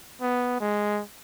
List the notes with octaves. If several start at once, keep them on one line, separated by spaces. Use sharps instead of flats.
B3
G#3